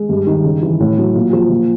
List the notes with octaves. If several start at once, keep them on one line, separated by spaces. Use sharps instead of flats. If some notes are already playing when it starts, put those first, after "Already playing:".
Already playing: G#3
G2
D#3
C#3
E3
A2
F#3
A#2
F3
A#2